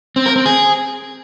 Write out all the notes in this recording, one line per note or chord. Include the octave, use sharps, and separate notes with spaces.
C4
A#4
C4
G#4